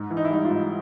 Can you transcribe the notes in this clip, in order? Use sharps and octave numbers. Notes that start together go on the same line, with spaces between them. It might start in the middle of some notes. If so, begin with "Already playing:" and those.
Already playing: G#2
E3
D#4
E4
G3 D#4
F4
G#2